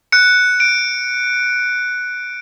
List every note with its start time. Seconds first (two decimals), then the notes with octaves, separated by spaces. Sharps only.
0.12 F#6 C#7
0.60 D7